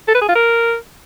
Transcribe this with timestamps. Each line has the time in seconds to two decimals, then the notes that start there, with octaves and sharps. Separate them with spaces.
0.08 A4
0.15 B4
0.21 G#4
0.28 F4
0.35 A#4